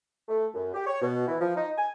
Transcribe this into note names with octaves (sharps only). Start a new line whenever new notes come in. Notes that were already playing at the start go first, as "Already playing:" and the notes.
A3
F#2
G4
C#5
B2
E3
F3
D#4
G#5